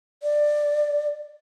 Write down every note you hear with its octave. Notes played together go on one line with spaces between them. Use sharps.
D5